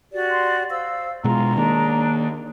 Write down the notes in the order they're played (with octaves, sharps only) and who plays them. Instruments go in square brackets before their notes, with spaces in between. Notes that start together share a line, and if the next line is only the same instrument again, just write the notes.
[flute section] F#4 G4 D5
[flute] C6
[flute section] C5 E6 [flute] F5
[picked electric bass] B2 G#3 [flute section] F4 [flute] A#5
[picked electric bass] D#3 A#3 [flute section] D4 G#4